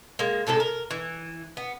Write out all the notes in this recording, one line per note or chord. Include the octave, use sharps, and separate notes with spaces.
G#3 A#3
A2 C3 G#3 A4
A#4
E3
B3